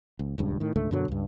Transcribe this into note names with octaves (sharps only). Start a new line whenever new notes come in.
C#2
D#1 C#2 G2
A2 D#3
C#2 G#2 D3 A3
F#2 B2 D3 F#3
C#2 G2